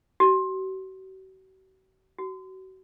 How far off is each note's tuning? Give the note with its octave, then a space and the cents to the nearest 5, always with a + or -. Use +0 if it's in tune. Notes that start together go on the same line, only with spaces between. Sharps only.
F#4 +45
F#4 +30